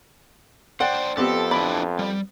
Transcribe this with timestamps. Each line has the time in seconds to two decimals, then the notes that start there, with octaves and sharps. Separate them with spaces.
0.80 D4 C5 D5 F#5 G5
1.17 F2 B3 C4 G4 A4
1.51 D4 E4 D5 B5
1.99 G3